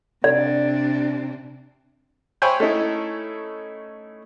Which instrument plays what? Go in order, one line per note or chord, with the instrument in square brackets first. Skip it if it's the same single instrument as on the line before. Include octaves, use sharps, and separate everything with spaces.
[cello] C3 D4 [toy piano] D5
[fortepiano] C5 C#5 E5 G5 G#5 B5
A3 C#4 D#4 E4